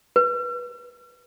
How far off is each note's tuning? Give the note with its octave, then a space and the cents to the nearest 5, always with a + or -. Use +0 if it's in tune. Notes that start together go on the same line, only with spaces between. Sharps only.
B4 -20